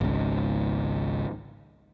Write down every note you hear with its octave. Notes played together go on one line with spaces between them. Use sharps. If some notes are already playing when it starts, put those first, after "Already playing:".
G#1 C#2